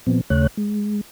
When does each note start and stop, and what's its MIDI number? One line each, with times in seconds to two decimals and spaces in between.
0.07 0.21 46
0.07 0.21 53
0.07 0.21 59
0.07 0.21 60
0.30 0.47 39
0.30 0.47 49
0.30 0.47 57
0.30 0.47 73
0.30 0.47 90
0.57 1.01 56